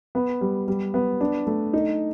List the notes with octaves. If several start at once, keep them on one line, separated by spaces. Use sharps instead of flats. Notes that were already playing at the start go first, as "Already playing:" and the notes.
B3
G3
G3
B3
D4
A3
D#4